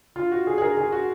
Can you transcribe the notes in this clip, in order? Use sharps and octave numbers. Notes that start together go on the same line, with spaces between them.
F4
F#4
G#4
G#4
A#4
G#4
F#4